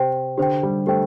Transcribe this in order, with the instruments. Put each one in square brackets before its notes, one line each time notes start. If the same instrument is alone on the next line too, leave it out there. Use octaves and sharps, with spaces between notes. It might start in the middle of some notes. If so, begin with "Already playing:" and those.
Already playing: [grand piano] C3 [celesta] G4 C5 G5
[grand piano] D3 [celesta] G4 C5 G5
[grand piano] G3
[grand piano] A3 [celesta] G4 C5 G5